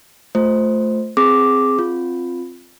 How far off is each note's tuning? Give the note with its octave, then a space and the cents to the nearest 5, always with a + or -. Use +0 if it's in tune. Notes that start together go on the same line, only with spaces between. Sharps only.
A3 +0 F4 +0 C5 +0
C4 +0 G#4 +0 D6 +0
C4 +0 F4 +0